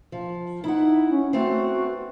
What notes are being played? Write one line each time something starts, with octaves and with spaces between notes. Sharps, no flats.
F3
D#4 E4 F#5
C#4
A3 B3 C4 F#4